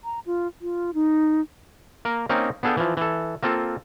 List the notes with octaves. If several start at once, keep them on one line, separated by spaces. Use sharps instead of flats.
A#5
F4
F4
D#4
A#3 A#4
A#3 C4 C#4 D#4 A#4
B3 D4 G#4 A4 F5 G5
E3 F3
E3 A4
A#3 C4 F4 A4